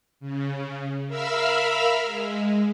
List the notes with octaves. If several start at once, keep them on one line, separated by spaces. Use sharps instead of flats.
C#3
A#4 E5 F5 B5 E6 F6
G#3